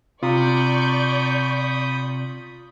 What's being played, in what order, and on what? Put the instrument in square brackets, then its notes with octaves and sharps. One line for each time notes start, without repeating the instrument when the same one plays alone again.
[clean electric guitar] C3 [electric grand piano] F4 [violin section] D5 C#6 G6 [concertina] B5 D#6